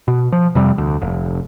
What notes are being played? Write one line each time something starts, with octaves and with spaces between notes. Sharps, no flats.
B2
F3
F2 C3 G3
D2
F1